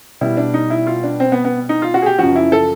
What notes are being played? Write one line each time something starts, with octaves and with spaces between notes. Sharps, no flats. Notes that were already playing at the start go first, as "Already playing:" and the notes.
B2 G3 E4
D4
D#4
E4
F4
D4
C4
B3
B3
D#4
F4
F#4
G#4
G4
F#2 C#3 F3 F#4
E4
A4